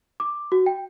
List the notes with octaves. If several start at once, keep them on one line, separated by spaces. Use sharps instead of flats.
D6
F#4
G5